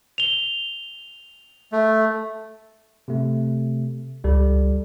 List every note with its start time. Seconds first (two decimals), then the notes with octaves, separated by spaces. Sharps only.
0.18 F7 G7
1.72 A3
3.08 C3 A3
4.24 C#2 G3 A4